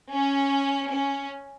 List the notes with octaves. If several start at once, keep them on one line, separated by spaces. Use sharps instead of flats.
C#4
C#4